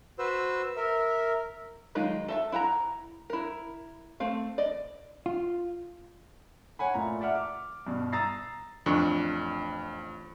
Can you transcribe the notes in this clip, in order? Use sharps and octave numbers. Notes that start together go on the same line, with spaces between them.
F#4 B4 C5 E6
A#4 E5
D#3 F#3 G#3 D#4 F4
A4 E5 A5
E4 F#5 G5 A#5
E4 A#4
A3 C4 F5
D5 D#5
F4
C#5 F#5 G#5 B5
A#2 A3 A#5
D5 E5 F#5 F6
D6
G2 B2
A#5 D#6 E6 A6 A#6 C7
A1 F2 D4 C#6